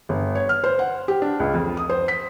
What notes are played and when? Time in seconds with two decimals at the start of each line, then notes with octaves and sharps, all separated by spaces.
0.09 G1
0.35 C#5
0.49 F6
0.64 C5
0.79 F#5
1.08 G4
1.22 D4
1.40 C#2
1.54 F2
1.77 D#6
1.89 C5
2.08 B6